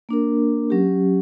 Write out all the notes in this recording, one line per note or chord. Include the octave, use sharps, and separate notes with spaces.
A#3 D4 A#4
F#3 C#4 G4